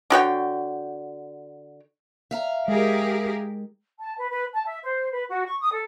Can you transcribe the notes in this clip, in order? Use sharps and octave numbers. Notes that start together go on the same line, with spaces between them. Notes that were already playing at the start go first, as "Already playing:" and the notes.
D3 F#4 C#5 G5
E5 F5 A#5
G#3 G4 G#4 A#4
A5
B4
B4
A5
E5
C5
B4
F#4
C#6
D#6
A4